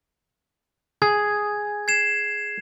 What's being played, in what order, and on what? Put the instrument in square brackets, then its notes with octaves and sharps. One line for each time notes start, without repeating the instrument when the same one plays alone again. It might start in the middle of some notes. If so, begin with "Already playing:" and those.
[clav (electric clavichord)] G#4 [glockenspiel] G#6
[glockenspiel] G#6 C7 E7